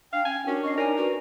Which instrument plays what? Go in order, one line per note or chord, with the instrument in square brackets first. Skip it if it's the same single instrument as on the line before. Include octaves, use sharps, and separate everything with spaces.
[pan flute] D4 [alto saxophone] F5 [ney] G5
[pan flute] C#4 [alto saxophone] G#5
[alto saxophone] C#4 [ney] D4 [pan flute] F#4 [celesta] A#4
[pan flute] D#5 [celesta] C#6 C7
[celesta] D#4 C#5 D5 [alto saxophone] A#4 [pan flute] G#5
[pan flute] F#4 [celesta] B4 D5